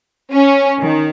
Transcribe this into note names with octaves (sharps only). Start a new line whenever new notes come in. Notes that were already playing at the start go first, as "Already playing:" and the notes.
C#4
D#3